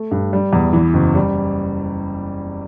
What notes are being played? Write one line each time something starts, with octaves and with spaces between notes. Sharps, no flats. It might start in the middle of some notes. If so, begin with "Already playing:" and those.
Already playing: A3
G2
G3
E2
E3
F#1
G3